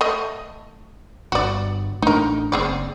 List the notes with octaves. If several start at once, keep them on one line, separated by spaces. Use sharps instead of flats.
A3 D#5
G1 G2 F#4 D5
A1 A3 D4 D#4 A#4
F#1 C4 G#4 D5